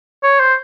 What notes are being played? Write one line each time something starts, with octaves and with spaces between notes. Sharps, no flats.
C#5
C5